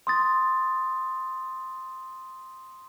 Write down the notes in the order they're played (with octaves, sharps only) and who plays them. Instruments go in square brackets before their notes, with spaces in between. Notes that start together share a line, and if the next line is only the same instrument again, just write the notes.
[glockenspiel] C6 D#6 A6